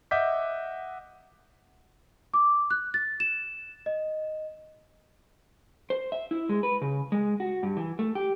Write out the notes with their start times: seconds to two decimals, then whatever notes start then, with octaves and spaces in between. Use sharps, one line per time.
0.11 D#5 E5 F#5 D6 G6 B6
2.34 D6
2.71 F#6
2.94 A6
3.20 E7
3.86 D#5
5.90 C5
6.12 E5
6.31 E4
6.49 G#3
6.63 B4
6.82 C#3
7.12 G#3
7.40 F#4
7.63 G2
7.77 E3
7.99 A3
8.15 G4